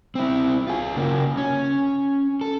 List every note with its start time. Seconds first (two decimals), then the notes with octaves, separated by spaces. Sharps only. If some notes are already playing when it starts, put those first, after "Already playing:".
0.15 C4 E4
0.67 F4 G#4
0.96 C#3 A#3
1.37 C#4
2.41 A4